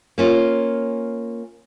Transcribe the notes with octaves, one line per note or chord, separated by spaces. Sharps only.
A#3 C#4 F4